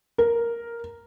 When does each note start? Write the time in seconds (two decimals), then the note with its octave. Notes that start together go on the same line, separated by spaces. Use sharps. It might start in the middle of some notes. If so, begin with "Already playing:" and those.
0.18 A#4